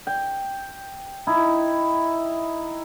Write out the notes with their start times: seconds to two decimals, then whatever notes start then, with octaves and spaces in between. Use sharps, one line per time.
0.07 G5
1.27 D#4 E4